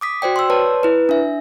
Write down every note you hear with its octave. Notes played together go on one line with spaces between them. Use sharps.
D6 D#6 B6
F#4 C5 D5 G5
C6 E6
B4 C#5 D5 A5 C6
E4 B4
D4 E5